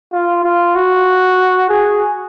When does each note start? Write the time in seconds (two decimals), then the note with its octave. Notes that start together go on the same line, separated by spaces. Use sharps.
0.13 F4
0.44 F4
0.75 F#4
1.69 G#4